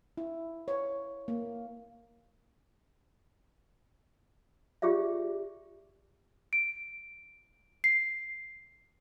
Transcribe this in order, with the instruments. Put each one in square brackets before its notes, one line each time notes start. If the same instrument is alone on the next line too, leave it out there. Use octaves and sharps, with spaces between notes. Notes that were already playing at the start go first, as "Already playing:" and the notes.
[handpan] E4
C#5
A#3
[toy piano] F4 G4 G#4 D5 E5
[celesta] D7
C7